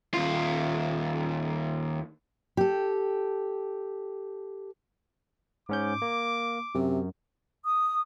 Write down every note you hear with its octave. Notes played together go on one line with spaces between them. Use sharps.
D#2 F4
G4 A4
G#2 C#4 D6 G6
A#3
F#2 C3
D#6